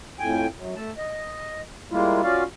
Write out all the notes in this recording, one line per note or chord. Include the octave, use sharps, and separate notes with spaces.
F2 A2 G5 G#5
F#2
A3 A5
D#5
G3 G#3 A#3 E4 F4
C#4 F4 F#4 D5 F5